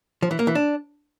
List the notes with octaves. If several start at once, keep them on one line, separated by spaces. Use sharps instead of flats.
F3
E3
A#3
E3
D4